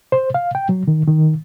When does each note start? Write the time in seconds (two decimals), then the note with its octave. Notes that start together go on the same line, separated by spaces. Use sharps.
0.12 C5
0.34 F5
0.55 G5
0.69 F#3
0.88 D#3
1.07 D#3